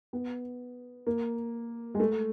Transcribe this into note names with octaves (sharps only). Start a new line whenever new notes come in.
B3
A#3
G#3
A3